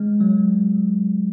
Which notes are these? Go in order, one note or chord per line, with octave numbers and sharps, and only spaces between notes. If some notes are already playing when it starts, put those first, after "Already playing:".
Already playing: G#3
F#3